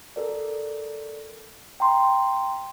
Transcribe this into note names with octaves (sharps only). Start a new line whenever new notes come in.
A4 A#4 D5
G5 A#5 C6